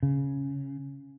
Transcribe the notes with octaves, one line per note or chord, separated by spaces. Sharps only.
C#3